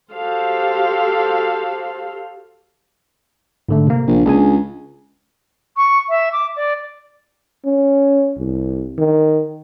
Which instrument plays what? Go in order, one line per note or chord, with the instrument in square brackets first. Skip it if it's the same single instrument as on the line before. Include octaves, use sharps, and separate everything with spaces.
[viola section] F#4 G4 A4 C5 F5
[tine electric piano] G#2 D3 A3
C3 A#3
[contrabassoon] A#1
[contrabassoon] C#2 [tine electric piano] D4 G#4 G#5
[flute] C#6
E5
D6
D5
[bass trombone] C#4
C2
D#3